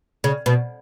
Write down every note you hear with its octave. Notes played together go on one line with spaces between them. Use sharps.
C#3
B2